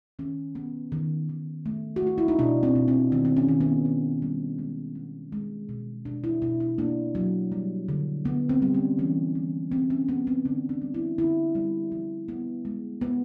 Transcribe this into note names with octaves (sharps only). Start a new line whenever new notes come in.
D#3 C#4
B3
D#3
D#3
A3
F#4
A3 F4
E4
D#4
B2 D4
C4
B2
C4
D#3 C4
C4
C#4
D#3
B3
D#3
G3
G#3
B3
G#3
B2
B2 D4
E4
B2 E4
E4
A#3 D4
F#3
G3
D3
D3 B3
C4
G3
C#4
E3 C#4
E3
B3 C4
C#4
B3
C4
D3 D4
D4
G3
E4
D3 E4
G3
F3
B3
G#3
B3